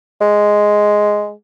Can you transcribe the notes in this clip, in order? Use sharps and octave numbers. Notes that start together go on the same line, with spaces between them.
G#3